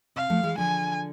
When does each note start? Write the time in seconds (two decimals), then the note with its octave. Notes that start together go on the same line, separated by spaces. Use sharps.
0.16 C3 F5
0.30 F3 A3
0.43 E3 G#3
0.57 D3 F3 G#5